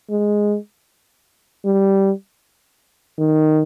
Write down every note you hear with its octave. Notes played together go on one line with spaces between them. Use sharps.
G#3
G3
D#3